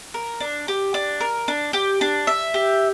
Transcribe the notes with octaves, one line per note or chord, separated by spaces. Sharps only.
A#4
D4
G4
D4
A#4
D4
G4
D4
E5
G4